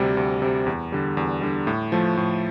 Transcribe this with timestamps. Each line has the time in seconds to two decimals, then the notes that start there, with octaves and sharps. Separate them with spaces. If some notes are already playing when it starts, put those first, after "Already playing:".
Already playing: D2 C3 G3
0.17 D2
0.42 C3 G3
0.66 E2
0.92 D3 G3
1.17 E2
1.41 D3 G3
1.67 A2
1.92 F3 A3
2.17 A2